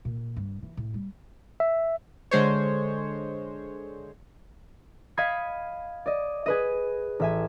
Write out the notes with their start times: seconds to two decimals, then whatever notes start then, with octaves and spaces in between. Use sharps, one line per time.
0.05 A#2
0.36 G2
0.62 E3
0.77 A2
0.94 G3
1.60 E5
2.31 D3 G#3 C5 C#5
5.17 D#5 F5 B5 G#6 B6 C#7
6.06 D5 D#5
6.46 G#4 B4 D#5
7.20 A1 E5 G#5